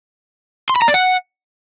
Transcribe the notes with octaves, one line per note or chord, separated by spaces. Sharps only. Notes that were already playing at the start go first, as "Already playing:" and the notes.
C6
B5
A#5
D5
F#5